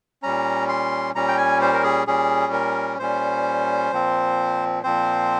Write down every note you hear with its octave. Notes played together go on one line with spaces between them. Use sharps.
A#2 G3 C#4 A#5
C6
A#2 G3 C#4 A#5
G5
G#5
C5
A#4
G#4
A#2 G3 C#4 G#4
A#4
A#2 G3 C#4 C5
A#2 F3 C4
A#2 F3 C4 C5